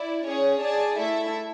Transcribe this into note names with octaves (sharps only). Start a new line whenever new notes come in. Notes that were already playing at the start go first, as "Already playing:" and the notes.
Already playing: E4 D5
C#4 G#4 C#5
G#4 D5 A5
A3 E4 A4 E5